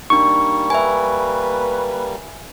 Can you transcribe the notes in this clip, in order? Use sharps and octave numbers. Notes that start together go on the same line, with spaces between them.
G3 A#3 D4 D#4 C#6
B4 E5 G#5